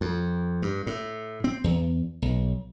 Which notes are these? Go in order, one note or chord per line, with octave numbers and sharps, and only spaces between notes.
F2
G2
A2
C4
E2
B1